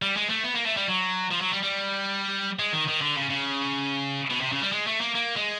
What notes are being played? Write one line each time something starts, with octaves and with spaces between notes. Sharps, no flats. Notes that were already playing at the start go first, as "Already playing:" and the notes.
G3
G#3
A3
B3
A#3
A3
G3
F#3
F3
F#3
G3
G3
G#3
D#3
D#3
D3
C#3
C#3
B2
C3
C#3
G3
G#3
A3
A#3
A#3
G#3